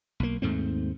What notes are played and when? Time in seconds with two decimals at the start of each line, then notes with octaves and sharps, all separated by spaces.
0.20 B1 A#3
0.42 D#2 G#2 A3 C4